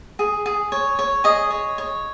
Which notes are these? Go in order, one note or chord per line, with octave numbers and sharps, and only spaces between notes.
G#4
G#4
C#5
C#5
G#4 D#5
C#5
C#5